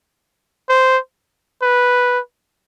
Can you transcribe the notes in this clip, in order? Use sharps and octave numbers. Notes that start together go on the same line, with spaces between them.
C5
B4